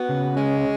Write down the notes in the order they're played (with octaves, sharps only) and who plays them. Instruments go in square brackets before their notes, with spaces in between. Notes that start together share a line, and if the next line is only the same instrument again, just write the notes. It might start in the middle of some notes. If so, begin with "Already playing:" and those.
Already playing: [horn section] B3 [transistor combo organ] F#4
[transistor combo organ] C#3
[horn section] G#3 [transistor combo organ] C#4